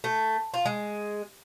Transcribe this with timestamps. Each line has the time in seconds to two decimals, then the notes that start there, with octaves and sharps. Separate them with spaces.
0.04 A3
0.54 F4
0.66 G#3